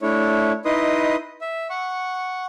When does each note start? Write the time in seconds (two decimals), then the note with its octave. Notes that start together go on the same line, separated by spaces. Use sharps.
0.01 A3 D4 E4 C#5
0.65 D#4 E4 B4 D#5 C6 D#6
1.41 E5
1.70 F#5 C#6